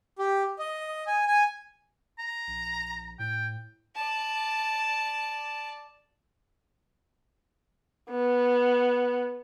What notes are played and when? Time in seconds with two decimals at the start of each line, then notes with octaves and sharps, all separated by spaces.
0.19 G4
0.59 D#5
1.07 G#5
1.27 G#5
2.19 A#5
2.47 A#1
3.19 A2 G5
3.95 D5 A5
8.11 B3